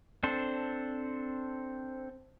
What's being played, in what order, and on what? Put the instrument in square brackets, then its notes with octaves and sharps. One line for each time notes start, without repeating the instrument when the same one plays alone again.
[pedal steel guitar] C4 D4 A4 C5